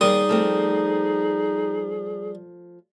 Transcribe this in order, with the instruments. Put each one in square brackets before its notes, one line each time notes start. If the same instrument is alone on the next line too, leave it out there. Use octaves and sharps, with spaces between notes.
[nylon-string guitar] D#2 A#4 [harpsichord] G3 C6 D#6 [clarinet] D#4 [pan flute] G#4
[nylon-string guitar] F3 A3 C4